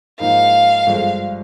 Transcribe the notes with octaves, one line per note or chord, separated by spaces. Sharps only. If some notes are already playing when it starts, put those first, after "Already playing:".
G#2 F3 A#3 D#4 F5
G1 G2 F3 G#3